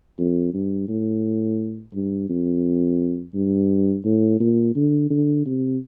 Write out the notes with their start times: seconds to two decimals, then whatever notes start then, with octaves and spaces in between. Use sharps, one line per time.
0.19 F2
0.54 G2
0.88 A2
1.94 G2
2.29 F2
3.34 G2
4.05 A2
4.40 A#2
4.76 D3
5.10 D3
5.46 C3